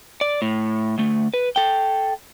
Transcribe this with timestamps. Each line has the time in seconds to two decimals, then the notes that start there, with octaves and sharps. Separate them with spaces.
0.21 D5
0.42 A2
0.98 D2 A3
1.34 B4
1.56 A4 G5